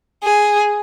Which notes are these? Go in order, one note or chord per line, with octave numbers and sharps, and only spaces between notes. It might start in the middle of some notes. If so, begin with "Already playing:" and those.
G#4